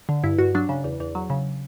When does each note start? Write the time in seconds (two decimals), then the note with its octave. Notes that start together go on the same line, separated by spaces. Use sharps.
0.09 D3
0.23 G2 E4
0.39 G2 F#4
0.55 F#3 D4
0.69 C#3
0.84 E2
1.00 E2
1.15 F#3
1.30 C#3